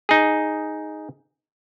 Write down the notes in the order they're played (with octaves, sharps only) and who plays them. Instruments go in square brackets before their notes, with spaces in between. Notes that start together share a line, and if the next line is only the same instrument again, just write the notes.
[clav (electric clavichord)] D#4 G#4